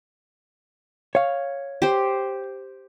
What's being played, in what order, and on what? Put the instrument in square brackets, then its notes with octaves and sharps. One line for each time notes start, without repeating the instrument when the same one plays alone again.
[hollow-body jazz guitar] C#5 F5
[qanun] G4 C5